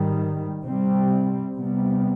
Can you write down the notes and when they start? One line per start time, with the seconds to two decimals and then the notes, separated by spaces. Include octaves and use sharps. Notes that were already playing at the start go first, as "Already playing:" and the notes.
Already playing: G#2 D#3 G3
0.63 C3 G3 C4
1.57 C3 G3 B3